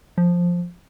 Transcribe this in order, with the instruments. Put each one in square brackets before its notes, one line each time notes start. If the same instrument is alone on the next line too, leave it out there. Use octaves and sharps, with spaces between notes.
[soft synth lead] F3